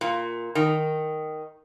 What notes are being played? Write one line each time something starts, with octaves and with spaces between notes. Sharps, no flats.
A#2
D#3